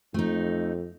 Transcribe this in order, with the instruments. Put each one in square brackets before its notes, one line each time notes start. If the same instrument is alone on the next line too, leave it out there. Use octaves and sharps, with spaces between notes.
[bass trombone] F2 [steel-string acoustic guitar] A3 D#4